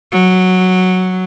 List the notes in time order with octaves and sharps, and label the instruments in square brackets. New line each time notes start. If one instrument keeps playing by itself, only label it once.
[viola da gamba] F#3